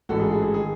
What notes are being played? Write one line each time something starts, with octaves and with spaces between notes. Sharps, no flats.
A1 G#2 E3 F#4 A4
G#4
G#4
G#4
D#3 G#4